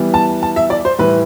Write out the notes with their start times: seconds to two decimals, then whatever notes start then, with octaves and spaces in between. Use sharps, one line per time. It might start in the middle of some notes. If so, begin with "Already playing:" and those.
Already playing: E3 G3 B3
0.14 A5
0.43 A5
0.56 E5
0.70 D5
0.85 C5
0.98 A2 E3 G3 B4